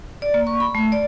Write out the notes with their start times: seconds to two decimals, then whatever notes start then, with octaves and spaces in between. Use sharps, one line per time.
0.22 D5
0.34 A#3
0.47 C#6
0.60 B5
0.75 A3
0.92 D5